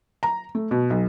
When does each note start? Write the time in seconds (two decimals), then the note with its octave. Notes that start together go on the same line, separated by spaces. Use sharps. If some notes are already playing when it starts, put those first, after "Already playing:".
0.23 A#5
0.55 A3
0.71 B2
0.90 B1